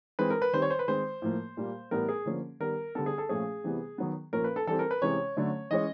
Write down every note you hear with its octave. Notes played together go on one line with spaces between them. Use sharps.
E3 G#3 C4 B4
A#4
B4
D#3 G3 C4 C5
C#5
C5
B4
D#3 G#3 C4 C5
A2 F3 A#3
A#2 G3 A#3
A2 E3 G3 B3 A#4
G#4
D3 F3 A#3 C#4
D#3 G3 B3 A#4
D3 G3 B3 A4
G#4
A4
A#2 F3 A3 C#4 G#4
C3 E3 G3 B3
D#3 F#3 B3
A#2 F3 A#3 C#4 A#4
B4
A4
E3 G3 C4 A4
A#4
B4
C3 E3 G#3 C#4 C#5
D3 F#3 A3 C#4
E3 G#3 C#4 D#5